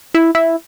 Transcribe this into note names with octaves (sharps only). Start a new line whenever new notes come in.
E4
E4